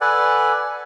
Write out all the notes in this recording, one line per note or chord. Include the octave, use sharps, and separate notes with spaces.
A4 B4 D5 F#5 G#5